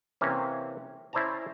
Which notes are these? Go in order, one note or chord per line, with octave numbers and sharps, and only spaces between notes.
C3 E3 A#3 C4 C#4
C#4 E4 C5 D5 A5 A#5